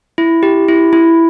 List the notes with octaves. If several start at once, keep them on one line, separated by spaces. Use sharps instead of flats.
E4
G4
E4
E4